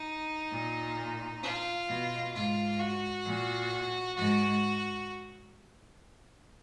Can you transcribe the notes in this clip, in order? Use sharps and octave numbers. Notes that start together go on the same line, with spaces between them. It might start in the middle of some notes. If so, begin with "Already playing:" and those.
Already playing: D#4
A#2
F4
B2
G#2 F4
F#4
A#2
G#2 F#4